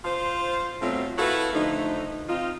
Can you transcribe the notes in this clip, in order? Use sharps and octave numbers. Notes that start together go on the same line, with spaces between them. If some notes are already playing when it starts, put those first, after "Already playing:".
F4 C5
B2 F#3 A3 C4 F4
E4 F#4 A4 B4 F5
D3 F3 A3 D#4
C4 D#4 F4